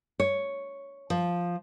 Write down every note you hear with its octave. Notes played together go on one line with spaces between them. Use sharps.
C#5
F3